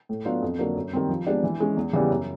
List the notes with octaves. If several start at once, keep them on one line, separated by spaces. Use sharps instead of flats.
A2
F#3 B3 D4 F4
F2
D3 F#3 A#3 D4
F#2
D#3 G3 C4
F3
G#3 B3 D4 G4
E3
G#3 C#4
E2
C#3 E3 G3 B3
F#2